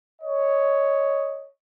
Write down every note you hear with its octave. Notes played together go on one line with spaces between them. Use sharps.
C#5 D#5